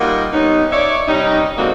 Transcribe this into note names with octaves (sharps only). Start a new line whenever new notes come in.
G3 A#3 D#4 F4 F#5
G3 B3 C#4 D#4
C#5 D5 E5
C3 G3 C#4 D#4
E2 D3 G#3 A#3 C4 F#4